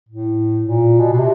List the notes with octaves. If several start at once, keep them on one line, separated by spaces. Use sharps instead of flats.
A2
A#2
B2
B2
C3